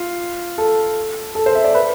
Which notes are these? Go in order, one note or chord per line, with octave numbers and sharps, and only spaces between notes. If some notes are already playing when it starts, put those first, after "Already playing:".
Already playing: F4
A4
A4
C5
E5
D5
B4